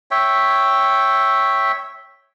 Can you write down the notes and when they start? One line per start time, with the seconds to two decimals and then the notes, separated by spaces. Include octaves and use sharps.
0.11 C#5 E5 G5